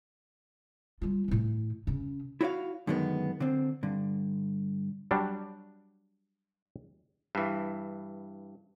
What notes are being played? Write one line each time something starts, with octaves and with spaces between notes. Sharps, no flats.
G3 F4
A2 E3
C#3 C#4
E4 F#4 C#5 D5 F5
F#2 D3 D#3 G#3 B3
D3 C4
G2 D3
F#3 G3 D4
G2 E3